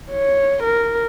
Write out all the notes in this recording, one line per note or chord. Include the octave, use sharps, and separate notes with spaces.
C#5
A#4